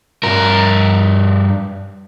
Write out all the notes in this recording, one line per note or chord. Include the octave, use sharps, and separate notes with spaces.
G2 A#4